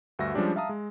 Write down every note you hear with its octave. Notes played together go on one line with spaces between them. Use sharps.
D2 G2 F#4 E5 E6 A#6
F3 G3 G#3 C#4 D4 G4
E5 F5 A5 A#5 D#6
G#3